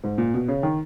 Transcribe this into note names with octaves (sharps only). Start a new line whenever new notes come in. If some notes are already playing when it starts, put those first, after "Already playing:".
G#2
A#2
B2
C#3
D#3